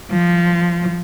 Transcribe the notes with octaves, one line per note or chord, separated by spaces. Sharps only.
F3